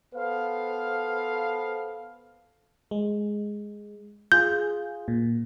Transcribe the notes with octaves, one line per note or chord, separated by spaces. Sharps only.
B3 A4 B4 C5 F5
G#3
F4 G#4 G6
A#2